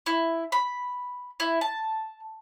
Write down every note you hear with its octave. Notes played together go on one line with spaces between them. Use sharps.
E4
B5
E4
A5